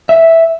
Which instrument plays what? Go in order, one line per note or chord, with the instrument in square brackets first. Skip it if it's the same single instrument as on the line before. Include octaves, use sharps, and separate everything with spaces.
[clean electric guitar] E5